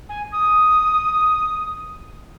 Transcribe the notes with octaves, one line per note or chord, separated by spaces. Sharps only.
G#5
D#6